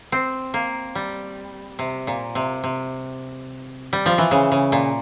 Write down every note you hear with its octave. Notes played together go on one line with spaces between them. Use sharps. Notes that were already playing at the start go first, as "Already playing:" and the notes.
C4
A#3
G3
C3
A#2
C3
C3
G3
F3
E3
C#3
C#3
A#2